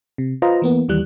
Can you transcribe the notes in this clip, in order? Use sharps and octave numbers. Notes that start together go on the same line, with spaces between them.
C3
F4 B4 C5 D#5 A#5
E3 A#3 B3
D#2 E3 G3 F#6